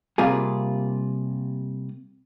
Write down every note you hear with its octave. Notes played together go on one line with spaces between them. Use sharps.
C3 G3 A#3 F4 G#4